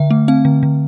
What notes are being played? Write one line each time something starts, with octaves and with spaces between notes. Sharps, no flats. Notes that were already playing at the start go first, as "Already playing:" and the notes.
Already playing: D3 E5
A3
C4 F5
D3
D3